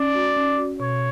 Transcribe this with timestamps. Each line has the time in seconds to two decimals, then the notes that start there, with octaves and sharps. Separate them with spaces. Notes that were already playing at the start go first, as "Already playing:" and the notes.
Already playing: C#4 D5
0.15 F#4
0.36 C#4
0.58 F#4
0.79 B2 C#5